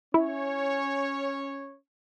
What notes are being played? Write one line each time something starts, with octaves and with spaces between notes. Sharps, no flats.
C#4 E4 C#5